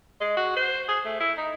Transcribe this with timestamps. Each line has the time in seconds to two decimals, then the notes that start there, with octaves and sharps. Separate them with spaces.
0.21 G#3
0.37 F#4
0.56 C5
0.88 G#4
1.05 A3
1.20 E4
1.38 D#4